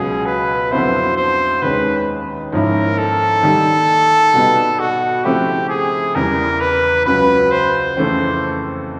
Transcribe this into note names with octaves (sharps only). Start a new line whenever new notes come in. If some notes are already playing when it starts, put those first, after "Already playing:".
Already playing: C#2 B2 F#3 G#4
B4
F2 D3 F#3 B3 E4 C5
C5
D#2 D#3 G#3 C#4 B4
G#2 F3 A#3 C#4 E4 A#4
A4
D#3 G3 A#3
B2 G3 B3 D#4
F#4
C#3 F3 A3 C4 E4 G4
G#4
E2 C#3 E3 G3 A#4
B4
C#2 C#3 F#3 B4
C5
F2 C#3 E3 A3 C4